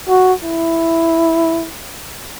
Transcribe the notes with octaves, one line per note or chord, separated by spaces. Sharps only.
F#4
E4